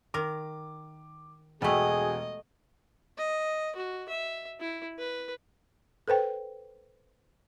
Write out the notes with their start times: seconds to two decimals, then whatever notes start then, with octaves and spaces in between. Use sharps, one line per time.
0.14 D#3 A#4 D6
1.62 E1 G3 A3 F#4 G#4 D#5 G5
3.18 D#5
3.75 F#4
4.09 E5
4.60 E4
4.98 B4
6.08 A4 B4 C5 G5